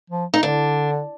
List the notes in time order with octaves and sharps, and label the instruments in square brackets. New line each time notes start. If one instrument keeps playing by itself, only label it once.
[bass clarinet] F3
[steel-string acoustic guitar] D#4
[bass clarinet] D3 [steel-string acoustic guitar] D4